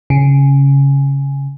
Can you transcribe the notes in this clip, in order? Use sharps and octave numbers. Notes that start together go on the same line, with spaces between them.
C#3